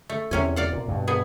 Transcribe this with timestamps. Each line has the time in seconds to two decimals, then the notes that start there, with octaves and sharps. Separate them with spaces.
0.09 A3
0.31 E2 C3 C#4 G#5
0.56 D5 F5 F#5
0.73 A#2
0.88 G2 B2
1.08 B3 G#4